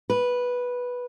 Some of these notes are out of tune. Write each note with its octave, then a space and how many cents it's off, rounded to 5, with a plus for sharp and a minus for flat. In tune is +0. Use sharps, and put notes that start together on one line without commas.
B4 -10